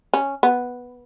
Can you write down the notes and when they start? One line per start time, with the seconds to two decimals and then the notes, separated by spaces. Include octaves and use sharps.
0.14 C#4
0.43 B3